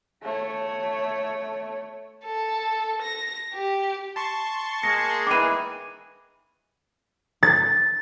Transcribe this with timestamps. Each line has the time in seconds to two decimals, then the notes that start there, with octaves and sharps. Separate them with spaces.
0.22 A3 C#5
2.25 A4
3.01 A#6
3.54 G4
4.16 A5 C6 C#6
4.83 G#3 A#3 G#4 A#6 C#7
5.27 D#3 E3 D6 D#7
7.43 A6